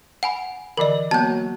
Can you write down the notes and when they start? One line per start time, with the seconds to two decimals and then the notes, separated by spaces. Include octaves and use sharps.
0.23 F#5 G#5 B5
0.77 D3 E3 A#4 D5 D#5
1.11 F#3 A#3 B3 A5 G6